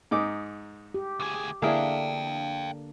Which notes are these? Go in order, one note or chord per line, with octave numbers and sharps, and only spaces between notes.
G#2 D#4 D6
G4
D2 G#4
D3 A#3 D4 E4 G#4 F5 G5